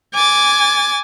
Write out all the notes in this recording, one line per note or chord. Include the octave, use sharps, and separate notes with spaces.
G#5 D6 A6